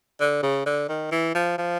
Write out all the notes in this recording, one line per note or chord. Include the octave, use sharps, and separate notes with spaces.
D3
C#3
D3
D#3
E3
F3
F3